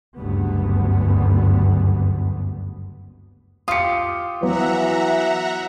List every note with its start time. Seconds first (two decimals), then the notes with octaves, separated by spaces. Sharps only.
0.16 F#1 D2 G2 B3
3.68 F4 G4 D#6 C#7
4.43 E3 F#3 B3 E5 F#5 A#5